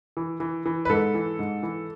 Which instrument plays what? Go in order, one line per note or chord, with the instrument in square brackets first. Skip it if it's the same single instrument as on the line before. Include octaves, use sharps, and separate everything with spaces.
[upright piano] E3
E3
E3
B4
G#2 A4
E3
G#2
E3